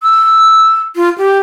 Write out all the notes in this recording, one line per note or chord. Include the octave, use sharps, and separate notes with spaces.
E6
F4
G4